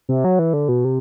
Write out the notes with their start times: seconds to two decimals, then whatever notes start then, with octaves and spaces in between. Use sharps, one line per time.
0.09 C3
0.24 F#3
0.39 E3
0.53 D3
0.69 B2
0.85 C3